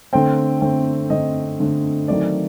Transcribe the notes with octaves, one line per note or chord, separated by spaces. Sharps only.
D3 A3 C4 G5
D3 A3 C4
D3 A3 C4 D#5
D3 A3 C4
D#3 F#3 A3 C4 D5